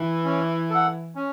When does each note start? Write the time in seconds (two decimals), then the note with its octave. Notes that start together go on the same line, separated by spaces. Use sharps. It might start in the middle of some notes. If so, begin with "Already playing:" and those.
Already playing: E3
0.25 C#4
0.70 A4 F#5
1.15 C#4